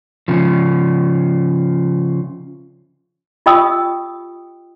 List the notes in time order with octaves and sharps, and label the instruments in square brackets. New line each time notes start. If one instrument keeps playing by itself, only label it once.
[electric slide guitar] C#3 F3
[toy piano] F4 G4 D#5 G5 D#6 E6